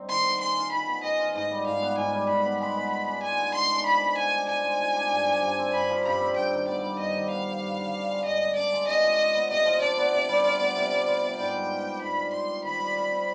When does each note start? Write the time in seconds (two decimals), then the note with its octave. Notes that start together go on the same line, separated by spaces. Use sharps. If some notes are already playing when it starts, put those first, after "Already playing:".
Already playing: G2 C4 D#4
0.09 D#3 C6
0.24 B3
0.41 G#4 C6
0.56 F4
0.72 D#3 B5
0.88 B3
1.04 G#4 D#5
1.19 F4
1.35 G#2 D#5
1.51 G3
1.66 G#2 F5
1.82 B3
1.97 G#2 G#5
2.13 G3
2.29 G#2 B5
2.44 B3
2.60 G#3 B5
2.77 B3
2.91 G#3
3.08 D4
3.23 G#3 G#5
3.39 B3
3.54 G#3 C6
3.71 D4
3.86 F3 B5
4.01 G#3
4.17 F3 G#5
4.33 D4
4.48 F3 G#5
4.64 G#3
4.80 F3
4.95 D4
5.11 G2
5.27 F3
5.43 G2
5.58 C4
5.74 G2 B5
5.90 F3
6.05 G2 B5
6.21 C4
6.37 G2 G5
6.53 D#3
6.68 B3 D5
6.84 G3
6.99 G2 D#5
7.15 D#3
7.31 B3 F5
7.46 G3
7.62 G2
7.78 D3
7.93 D4
8.09 G#3
8.25 G2 D#5
8.40 D3
8.56 D4 D5
8.72 G#3
8.88 C3 D#5
9.03 F3
9.19 D4
9.35 B3
9.50 C3 D#5
9.66 F3
9.82 D4 D5
9.97 B3
10.13 C3
10.29 G3
10.45 F4
10.60 B3
10.76 C3
10.91 G3
11.07 F4
11.23 B3
11.38 G#2 G5
11.55 G3
11.71 G4
11.86 C4
12.01 G#2 B5
12.17 G3
12.33 G4 C6
12.48 C4
12.64 D#3 B5
12.79 G3
12.95 F4
13.11 C4